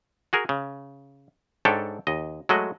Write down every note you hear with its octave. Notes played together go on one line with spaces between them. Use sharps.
F#4 G#4 A#4
C#3
G#2 D4 A4 C#5 E5 G5
D#2 D#5
F#3 G#3 A3 F#4 D#5